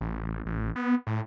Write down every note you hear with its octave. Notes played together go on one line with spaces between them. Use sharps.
A1
A1
B3
A2